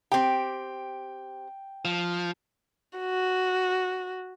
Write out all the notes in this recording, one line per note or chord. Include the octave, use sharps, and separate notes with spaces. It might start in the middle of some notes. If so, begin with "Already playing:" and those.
C4 G4 G5
F3
F#4